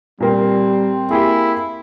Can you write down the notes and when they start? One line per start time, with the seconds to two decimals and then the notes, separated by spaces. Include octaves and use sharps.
0.20 A#2 G3 A#3 C4
1.11 A#3 E4 G4 G#4